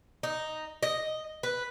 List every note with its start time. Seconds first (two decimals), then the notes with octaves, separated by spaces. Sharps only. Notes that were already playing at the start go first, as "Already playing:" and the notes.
0.23 D#4
0.83 D#5
1.43 B4